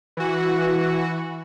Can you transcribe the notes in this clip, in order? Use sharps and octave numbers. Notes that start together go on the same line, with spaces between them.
E3 F#4